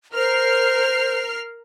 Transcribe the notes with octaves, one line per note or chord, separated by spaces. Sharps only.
A#4 C5 F6 C7